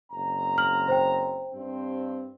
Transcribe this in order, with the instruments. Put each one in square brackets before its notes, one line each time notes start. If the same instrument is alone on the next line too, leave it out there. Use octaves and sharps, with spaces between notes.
[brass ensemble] F#1 C4 A#5
[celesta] F6 F#7
C5 G5
[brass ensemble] G2 C4